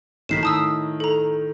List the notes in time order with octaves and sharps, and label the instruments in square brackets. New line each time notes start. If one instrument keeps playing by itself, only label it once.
[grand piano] A2 D#3 [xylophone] B6 C7 E7
[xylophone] A5 D#6 E6
A4 A#5